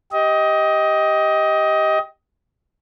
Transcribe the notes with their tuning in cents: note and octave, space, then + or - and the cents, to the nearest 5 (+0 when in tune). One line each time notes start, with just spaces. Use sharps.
G4 +0 D#5 +20